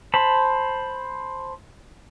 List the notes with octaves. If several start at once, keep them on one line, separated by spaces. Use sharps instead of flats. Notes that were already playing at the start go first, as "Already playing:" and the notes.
C5 A5 B5